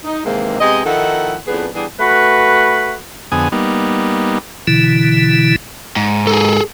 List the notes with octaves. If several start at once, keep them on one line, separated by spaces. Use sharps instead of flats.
D#4
G#2 C3 D#3 E3 G#3 A#3
C3 G#3 B3 D#5
D#3 F3 D#4 E4 A4 F#5
F2 A2 B3 D4 G#4 B4
E3 G3 B3 D4 G#4
A3 F#4 B4
F2 D3 B3 G#4 G#5 D#6
G3 A#3 B3 D#4
B2 D3 E3 E4
G#2
G#4 A4